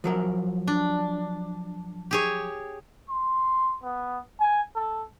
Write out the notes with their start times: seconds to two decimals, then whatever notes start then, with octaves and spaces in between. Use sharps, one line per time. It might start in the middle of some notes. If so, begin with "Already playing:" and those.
0.04 F3 F#3 A#4
0.68 D4
2.11 G4 G#4 C#5
3.09 C6
3.83 B3
4.40 G#5
4.76 A4